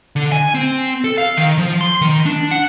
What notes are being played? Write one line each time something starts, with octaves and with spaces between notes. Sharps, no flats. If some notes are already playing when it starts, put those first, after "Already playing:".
D3
G#5
C4
A4
F5
D#3
F3
C6
D#3
D4
F#5